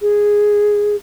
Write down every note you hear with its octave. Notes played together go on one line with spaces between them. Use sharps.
G#4